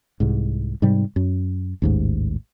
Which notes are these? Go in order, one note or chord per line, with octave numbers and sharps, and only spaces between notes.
C2 G#2
G#2 C3 G3
F#2
A1 D#2 G#2